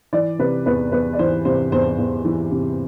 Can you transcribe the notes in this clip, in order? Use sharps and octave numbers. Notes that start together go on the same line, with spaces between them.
E3 D5
C3 B4
E2 B4
E2 B4
D5
E3 C5
C3 C5
E2 C5
E2
E3
C3